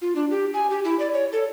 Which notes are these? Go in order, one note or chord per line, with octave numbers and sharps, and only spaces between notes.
F4
D4
G4
G#5
G4
E4
D5
C#5
A4